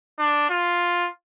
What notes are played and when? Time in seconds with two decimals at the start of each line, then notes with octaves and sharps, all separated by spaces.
0.19 D4
0.50 F4